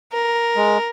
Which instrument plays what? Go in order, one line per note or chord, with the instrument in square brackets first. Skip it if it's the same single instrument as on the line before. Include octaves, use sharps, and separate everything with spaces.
[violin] A#4
[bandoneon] G#3